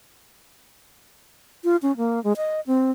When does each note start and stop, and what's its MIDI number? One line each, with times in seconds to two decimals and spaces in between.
1.64 1.76 65
1.82 1.96 61
1.97 2.22 58
2.24 2.33 56
2.37 2.60 75
2.67 2.91 60